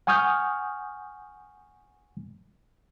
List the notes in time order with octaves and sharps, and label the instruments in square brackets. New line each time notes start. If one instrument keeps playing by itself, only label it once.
[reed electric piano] F#5 G#5 C#6 D#6 F6 G6